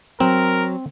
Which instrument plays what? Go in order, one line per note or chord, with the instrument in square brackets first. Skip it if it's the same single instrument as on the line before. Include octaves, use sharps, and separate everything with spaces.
[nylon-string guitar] F#3 [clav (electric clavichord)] C4 [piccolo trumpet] A#4